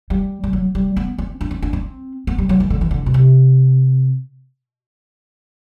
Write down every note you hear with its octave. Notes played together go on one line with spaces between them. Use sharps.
G3
G3
F#3
G3
B3
C4
D4
C4
D4
C4
B3
G3
F#3
E3
D3
E3
D3
B2
C3